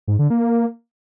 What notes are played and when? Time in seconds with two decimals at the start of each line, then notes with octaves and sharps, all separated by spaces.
0.08 G#2
0.19 D3
0.30 A#3